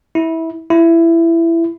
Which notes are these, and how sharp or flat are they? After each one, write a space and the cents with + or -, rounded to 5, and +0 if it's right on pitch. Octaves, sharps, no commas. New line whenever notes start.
E4 -20
E4 +15